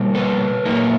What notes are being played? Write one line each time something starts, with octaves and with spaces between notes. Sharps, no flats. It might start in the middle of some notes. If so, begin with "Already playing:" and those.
Already playing: B2 G3 A#3
A4 B4
A#2 F#3 A#3 D#4